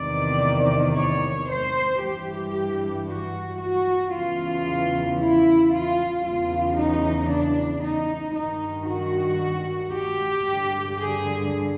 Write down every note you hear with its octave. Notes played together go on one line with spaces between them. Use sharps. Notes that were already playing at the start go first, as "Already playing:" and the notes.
Already playing: E2 C3 D#3 D5
C#5
C5
G2 E3 G4
F#4
F#4
E2 C#3 E3 F4
E4
F4
E2 C#3 E3 F4
D#4
D4
D#4
G2 D#3 D#4
F#4
G4
G2 D3
G#4